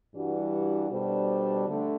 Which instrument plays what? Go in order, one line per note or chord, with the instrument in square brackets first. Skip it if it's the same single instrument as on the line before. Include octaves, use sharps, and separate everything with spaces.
[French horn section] G2 E3 G3 D4 F#4
B2 G3 D4 A4 C5
D3 A3